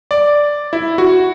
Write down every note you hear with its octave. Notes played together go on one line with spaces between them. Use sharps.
D5
E4
F#4